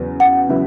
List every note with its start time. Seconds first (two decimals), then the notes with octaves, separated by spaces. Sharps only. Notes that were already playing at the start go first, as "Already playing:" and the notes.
Already playing: E2 C#3 F#3 B3
0.20 F#5
0.49 C#3 F#3 B3 E4